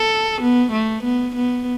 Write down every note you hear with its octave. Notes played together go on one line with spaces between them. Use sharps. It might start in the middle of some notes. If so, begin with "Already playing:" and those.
Already playing: A4
B3
A3
B3
B3